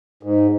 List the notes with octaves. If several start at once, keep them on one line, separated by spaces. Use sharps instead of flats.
G#2